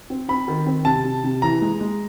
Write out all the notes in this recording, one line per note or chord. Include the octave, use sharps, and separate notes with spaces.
C4
C4 B5
D#3
C4
C3 A5
C3
C3
E3 A#5
G#3
G#3